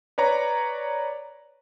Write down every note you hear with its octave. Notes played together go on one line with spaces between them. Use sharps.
B4 C#5 D5 A#5